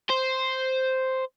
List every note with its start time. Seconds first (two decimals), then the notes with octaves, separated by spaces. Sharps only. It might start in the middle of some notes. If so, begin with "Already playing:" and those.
0.10 C5